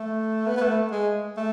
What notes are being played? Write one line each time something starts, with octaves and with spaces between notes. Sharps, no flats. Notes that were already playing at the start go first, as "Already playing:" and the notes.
Already playing: A3
B3
B3
A3
G#3
A3